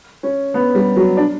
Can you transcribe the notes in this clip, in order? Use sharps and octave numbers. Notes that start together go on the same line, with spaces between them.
C#4
B3
G3
F#3
D4